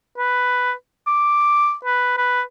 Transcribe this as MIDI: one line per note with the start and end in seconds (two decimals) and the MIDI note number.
0.18 0.72 71
1.07 1.74 86
1.85 2.17 71
2.17 2.41 71